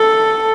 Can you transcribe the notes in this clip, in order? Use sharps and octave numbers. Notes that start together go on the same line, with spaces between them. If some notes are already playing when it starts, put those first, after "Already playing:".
Already playing: A4